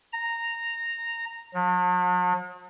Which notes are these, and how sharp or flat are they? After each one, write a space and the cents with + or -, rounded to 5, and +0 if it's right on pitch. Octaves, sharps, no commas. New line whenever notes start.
A#5 -10
F#3 -45